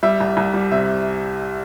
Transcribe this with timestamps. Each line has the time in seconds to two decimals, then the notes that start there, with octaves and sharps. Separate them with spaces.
0.03 G3 E5
0.20 C2
0.37 C2
0.54 G3
0.71 C3 E5